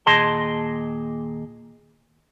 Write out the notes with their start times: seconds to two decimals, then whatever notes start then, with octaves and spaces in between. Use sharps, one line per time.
0.06 D#2 A#2 G#4 D#5 A5 C6